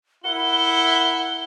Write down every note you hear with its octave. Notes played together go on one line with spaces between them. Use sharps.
E4 A#4 F#5 G7